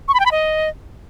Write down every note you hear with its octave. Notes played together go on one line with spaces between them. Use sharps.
C#6
B5
G5
B5
D#5